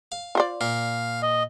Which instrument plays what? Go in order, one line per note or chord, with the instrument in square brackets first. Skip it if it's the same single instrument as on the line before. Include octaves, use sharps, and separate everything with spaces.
[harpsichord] F5
[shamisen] F4 C5 D5
[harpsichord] A#2 [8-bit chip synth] F5
[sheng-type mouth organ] D#5